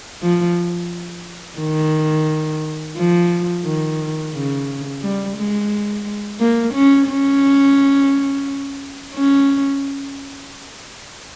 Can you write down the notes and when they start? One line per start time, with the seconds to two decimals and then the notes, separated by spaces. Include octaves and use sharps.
0.22 F3
1.59 D#3
2.97 F3
3.65 D#3
4.34 C#3
5.02 G3
5.37 G#3
6.40 A#3
6.74 C#4
7.08 C#4
9.14 C#4